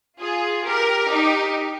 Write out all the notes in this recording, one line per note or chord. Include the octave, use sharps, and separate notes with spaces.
F4 G#4
G4 A#4
D#4 G4